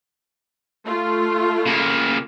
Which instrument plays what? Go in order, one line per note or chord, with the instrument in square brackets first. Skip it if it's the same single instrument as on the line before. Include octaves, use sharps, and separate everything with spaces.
[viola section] A3 F4
[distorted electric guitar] C#3 A#3